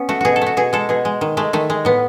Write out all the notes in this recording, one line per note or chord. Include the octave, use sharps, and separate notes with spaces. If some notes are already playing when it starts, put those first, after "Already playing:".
Already playing: B3 C#4
A3 F#4
B2 F#4 G#4
A4
A3 F#4
B2 G#4
G#3 A4
B2 G#4
G#3
D#3
G#3 A3
D#3 A3
G#3
A2 B3